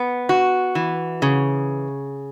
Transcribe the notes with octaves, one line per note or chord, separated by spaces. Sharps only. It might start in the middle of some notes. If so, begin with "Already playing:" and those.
Already playing: B3
F#4
E3
C#3